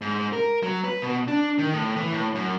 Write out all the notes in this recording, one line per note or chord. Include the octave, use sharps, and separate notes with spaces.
G#2
A#4
F#3
B4
B2
D4
D#3
A2
E3
A2
F#2